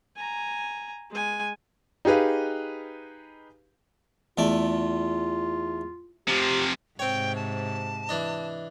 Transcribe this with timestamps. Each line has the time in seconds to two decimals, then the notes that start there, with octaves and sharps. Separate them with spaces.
0.16 G#5 A#5
1.11 G#3 G#5
2.05 D#4 G4 G#4 B4 F5
4.38 E2 A3 F4 D5
6.28 C3 F3 G4
6.99 G#2 C3 C4 C#5 G5
7.36 A5
8.09 E3 D4 D#5